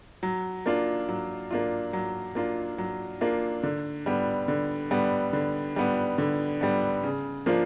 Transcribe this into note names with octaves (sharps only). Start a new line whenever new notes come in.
F#3
A#3 D4 F4
F#3
A#3 D4 F4
F#3
A#3 D4 F4
F#3
A#3 D4 F4
D3
G3 B3
D3
G3 B3
D3
G3 B3
D3
G3 B3
C#3
F3 A#3 D4 F4